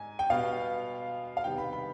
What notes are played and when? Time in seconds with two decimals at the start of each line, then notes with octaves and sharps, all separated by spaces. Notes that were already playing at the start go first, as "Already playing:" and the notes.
Already playing: G#2 G#5
0.19 G5
0.30 B2 G3 B3 F5
1.37 F5
1.44 C3 D#3 G3 B3 G5
1.58 B5
1.73 B5